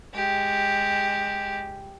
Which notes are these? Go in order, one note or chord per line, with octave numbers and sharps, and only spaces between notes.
G#3 G4